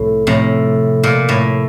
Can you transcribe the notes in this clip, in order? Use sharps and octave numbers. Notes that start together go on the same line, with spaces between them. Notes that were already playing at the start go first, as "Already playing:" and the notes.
Already playing: C2 A2 C3 F3
A2 C3 F3 C4
A#2
A2